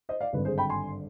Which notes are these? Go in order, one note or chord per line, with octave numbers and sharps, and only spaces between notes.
C5 D#5
D5 F5
G#1 G2 D3 B4
G#4 C5
G5 B5
G#5 C6